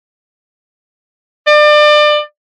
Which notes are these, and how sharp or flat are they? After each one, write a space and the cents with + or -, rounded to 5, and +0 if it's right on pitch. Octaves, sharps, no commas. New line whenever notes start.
D5 +30